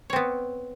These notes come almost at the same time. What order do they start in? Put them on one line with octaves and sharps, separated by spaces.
C#5 C4 B3